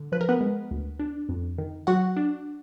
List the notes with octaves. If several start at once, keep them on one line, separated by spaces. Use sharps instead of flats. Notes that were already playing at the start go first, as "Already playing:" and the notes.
Already playing: D3
F3 B4
A#4
B3 B4
G#3
D2
D4
F2
D#3
F#3 F#4 F#5
D4